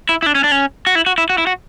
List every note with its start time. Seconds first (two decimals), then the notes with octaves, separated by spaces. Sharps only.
0.09 E4
0.22 E4
0.26 D4
0.35 C#4
0.44 D4
0.52 C#4
0.87 F#4
0.95 E4
1.06 F#4
1.18 E4
1.30 F#4
1.38 E4
1.47 F#4